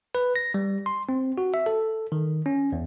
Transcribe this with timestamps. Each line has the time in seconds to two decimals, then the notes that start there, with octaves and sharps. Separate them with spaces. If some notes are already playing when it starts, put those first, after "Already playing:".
0.15 B4
0.36 A#6
0.54 G3
0.86 C6
1.09 C4
1.38 F#4
1.54 E5
1.66 A4
2.12 D#3
2.46 C#4
2.72 E2